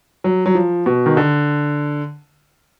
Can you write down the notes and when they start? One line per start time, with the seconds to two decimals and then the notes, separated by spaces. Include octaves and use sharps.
0.24 F#3
0.46 F#3
0.55 F3
0.86 B2
1.06 D#3
1.17 D3